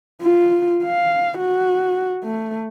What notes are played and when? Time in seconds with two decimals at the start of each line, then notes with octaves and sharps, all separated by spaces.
0.22 F4
0.85 F5
1.39 F#4
2.24 A3